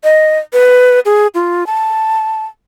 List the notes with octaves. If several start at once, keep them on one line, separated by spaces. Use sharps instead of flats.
D#5
B4
G#4
F4
A5